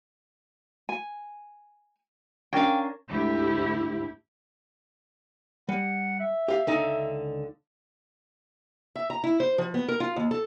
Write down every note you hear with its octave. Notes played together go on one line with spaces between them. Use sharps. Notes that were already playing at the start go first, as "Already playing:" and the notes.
G#5
C#4 D4 A#4 F5 G5
D2 G#2 E4 G4
G3 F#5
E5
G4 F5
C#2 D3 D#4
E5
A#5
E4
C5
F3
B3
A#4
F4
D#2
A4